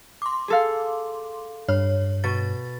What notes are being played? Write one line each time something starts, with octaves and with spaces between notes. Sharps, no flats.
C6 D6
G#4 A4 F5
G2 C#5 F6
B2 A6